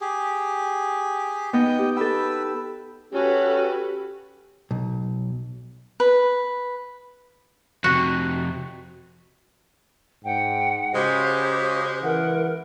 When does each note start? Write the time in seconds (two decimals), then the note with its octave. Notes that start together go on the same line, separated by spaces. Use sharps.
0.01 G4 G#4
1.53 B3 D#4 D#5 G5
1.79 G4
1.97 A4 B4 G5 E6
3.13 C#4 F#4 G4 A4 B4
4.71 B1
6.00 B4
7.84 F2 C3 F#4
10.25 G#2 F#5 G5
10.94 C#3 G#3 F#4 G4 C5
12.03 E3 A#4 F#5